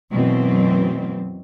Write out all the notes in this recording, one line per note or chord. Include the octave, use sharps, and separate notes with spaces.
F#2 B2 E3 F#3 A3 C4